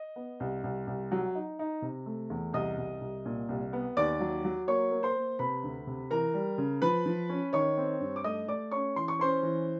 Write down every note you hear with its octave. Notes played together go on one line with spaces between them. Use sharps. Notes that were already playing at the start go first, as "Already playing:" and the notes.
Already playing: D#5
B3
C2
C2
C2
F#3
D#4
D#4
C3
A3
E2
C2 D#5 D#6
C2
C2
A#2
C2
B3
D#2 D5 D6
F#3
F#3
A#3 C#5 C#6
A#3
C5 C6
A#3
C3 B4 B5
D2
C3
E3 A#4 A#5
G3
C#3
F3 B4 B5
F3
C#4
D#3 C#5 C#6
C4
G2
D6
A3 D#5 D#6
A3 D5 D6
C#4 C#5 C#6
E3 C6
C#6
C#4 C5 C6
E3